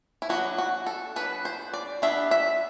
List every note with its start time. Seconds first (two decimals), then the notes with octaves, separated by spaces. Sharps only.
0.22 E4
0.29 F#3 B3 D4 F#4
0.58 F#4
0.86 A4
1.16 F#3 B3 D4 B4
1.45 C5
1.73 D5
2.02 G3 B3 D4 E5
2.31 E5